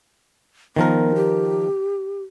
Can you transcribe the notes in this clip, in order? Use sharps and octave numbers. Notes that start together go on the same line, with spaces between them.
D#3 F3 B3 A#4
G4